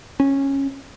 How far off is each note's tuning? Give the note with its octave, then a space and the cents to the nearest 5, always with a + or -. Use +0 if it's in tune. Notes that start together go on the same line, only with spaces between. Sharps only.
C#4 -15